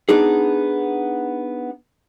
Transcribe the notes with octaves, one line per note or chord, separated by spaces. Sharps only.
B3 D4 D#4 G#4